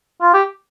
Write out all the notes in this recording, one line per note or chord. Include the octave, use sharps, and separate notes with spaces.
F4
G4